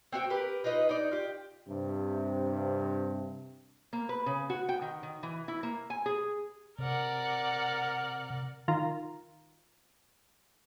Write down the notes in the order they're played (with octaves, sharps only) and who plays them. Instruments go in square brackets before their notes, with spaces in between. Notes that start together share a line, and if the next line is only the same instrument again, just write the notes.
[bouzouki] C4 F#4 F5 G5
G4 A#4 B4
D#4 F4 B4 D#5
D#4 D5
F4 G4
[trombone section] G2 C3
[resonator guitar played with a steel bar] A#3
B4
C#3
F#4
G5
D#3
D#3
E3
E4
A#3
G#5
G#4
[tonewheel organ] C3 [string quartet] A#4 D5 F#5
[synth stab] D#3 F4 A#5